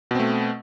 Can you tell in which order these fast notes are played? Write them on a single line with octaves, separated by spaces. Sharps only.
B2 C4 A3